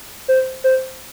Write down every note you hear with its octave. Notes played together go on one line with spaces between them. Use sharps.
C5
C5